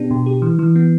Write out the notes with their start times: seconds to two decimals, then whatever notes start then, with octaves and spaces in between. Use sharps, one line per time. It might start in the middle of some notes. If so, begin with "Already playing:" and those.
Already playing: B2 B3 D4 G4
0.11 B2
0.26 G4
0.42 E3
0.59 E3
0.76 B3